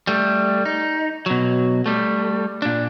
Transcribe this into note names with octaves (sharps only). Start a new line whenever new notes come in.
G3 A3
D#4
B2 F#3
G3 A3
A#2 D4